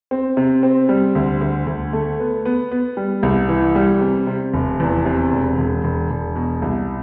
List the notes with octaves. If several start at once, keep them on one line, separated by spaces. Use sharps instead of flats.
C4
C3
C4
G3
D2
D2
D2
A3
B3
B3
B3
G3
C2
E3
G3
C3
C3
F1
E2
C3
E1
E1
E1
E1
B2
C2